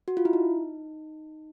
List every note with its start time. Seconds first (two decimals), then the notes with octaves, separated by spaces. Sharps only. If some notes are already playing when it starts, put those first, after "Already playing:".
0.08 F#4
0.17 F4
0.25 E4
0.33 D#4